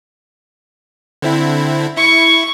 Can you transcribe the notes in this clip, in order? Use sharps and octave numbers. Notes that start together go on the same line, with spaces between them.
D3 C4 E4
E4 C#6